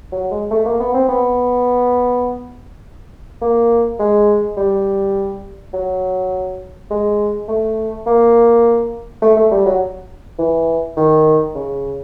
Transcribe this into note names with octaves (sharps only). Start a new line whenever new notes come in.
F#3
G#3
A3
A#3
B3
C4
B3
A#3
G#3
G3
F#3
G#3
A3
A#3
A3
A3
G3
F#3
E3
D#3
C#3